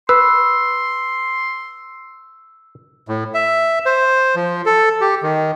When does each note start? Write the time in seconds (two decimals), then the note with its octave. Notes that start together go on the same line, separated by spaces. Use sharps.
0.09 B4 C6 E6
3.08 A2
3.34 E5
3.86 C5
4.36 F3
4.66 A4
5.01 G4
5.23 D#3